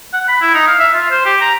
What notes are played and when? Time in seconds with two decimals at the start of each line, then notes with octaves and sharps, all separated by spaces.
0.13 F#5
0.28 B5
0.41 E4
0.54 D#4
0.67 F5
0.79 E5
0.94 F4
1.11 C5
1.25 G4
1.41 A#5